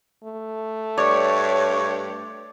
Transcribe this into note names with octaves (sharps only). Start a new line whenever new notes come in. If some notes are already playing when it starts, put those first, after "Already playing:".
A3
G2 C#5 D5